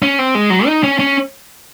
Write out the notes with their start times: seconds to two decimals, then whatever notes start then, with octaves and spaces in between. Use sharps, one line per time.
0.02 C#4
0.19 C4
0.35 G#3
0.50 F#3
0.66 D#4
0.83 C#4
0.99 C#4